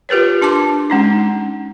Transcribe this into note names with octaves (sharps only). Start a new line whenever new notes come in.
F4 G4 A#4 B4 C#5
D4 A5 C6 D6
G#3 C#4 D#4